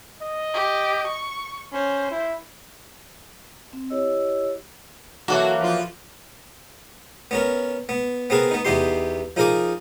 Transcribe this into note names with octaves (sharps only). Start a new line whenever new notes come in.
D#5
G4
C#6
C#4 C5
E4
C4
E4 G4 C#5 D#5 E6
E3 F#3 A#3 F#4 A4
F3 F4
B3 C#4 A#4
B3
B3 C4 G#4 A#4 B4
B3 D#4
E2 E3 B3 D#4 G4 C6
F3 D#4 G#4 A#4 G#5 D6